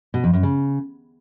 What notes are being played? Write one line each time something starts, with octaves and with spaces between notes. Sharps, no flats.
B2
F2
F#2
C#3